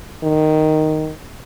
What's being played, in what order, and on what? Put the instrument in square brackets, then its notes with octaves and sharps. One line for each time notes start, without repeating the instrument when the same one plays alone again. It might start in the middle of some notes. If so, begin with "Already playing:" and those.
[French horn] D#3